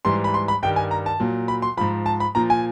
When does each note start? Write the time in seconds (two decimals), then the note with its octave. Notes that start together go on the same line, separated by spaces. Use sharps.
0.05 G#2 E3 G3 C6
0.24 B5
0.34 C6
0.48 B5
0.62 G2 D#3 G3 G5
0.76 G#5
0.91 A#5
1.06 A5
1.20 A#2 F#3
1.48 B5
1.62 C6
1.77 G#2 F3 B5
2.06 A5
2.20 B5
2.35 A#2 F3 A#5
2.50 G#5